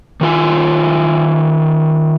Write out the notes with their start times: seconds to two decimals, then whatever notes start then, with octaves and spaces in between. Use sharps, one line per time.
0.21 D#3 F4 G#5